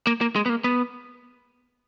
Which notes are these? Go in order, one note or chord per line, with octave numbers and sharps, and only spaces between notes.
A#3
A#3
G#3
B3
A#3
B3